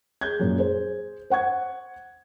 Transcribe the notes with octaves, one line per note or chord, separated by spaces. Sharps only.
G#4 G6 G#6
F#2 A#2
G#4 C5
C5 F#5 C#6 G#6